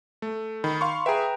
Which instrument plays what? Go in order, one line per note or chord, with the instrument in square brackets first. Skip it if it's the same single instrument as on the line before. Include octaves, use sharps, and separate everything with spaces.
[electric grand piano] A3
[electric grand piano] D#3 [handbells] B5
[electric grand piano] F5 C6 C#6
[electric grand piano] G#4 E5 [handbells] B4 G5 A#5